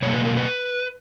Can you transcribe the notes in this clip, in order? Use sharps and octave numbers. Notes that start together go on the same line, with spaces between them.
B2 F#3 A#3 C#5
B4
A#4
B4